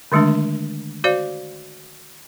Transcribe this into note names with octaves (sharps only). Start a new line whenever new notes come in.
D3 D#3 G#3 A3 D4
F#4 C5 D5 F5